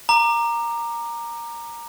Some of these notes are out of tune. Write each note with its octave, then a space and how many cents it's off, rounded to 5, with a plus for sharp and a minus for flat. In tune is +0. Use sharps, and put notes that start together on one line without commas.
A#5 +0 D6 +25